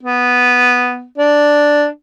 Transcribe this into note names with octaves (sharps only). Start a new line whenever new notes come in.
B3
D4